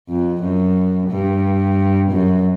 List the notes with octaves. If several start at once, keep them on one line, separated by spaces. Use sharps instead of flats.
F2
F#2
G2
F#2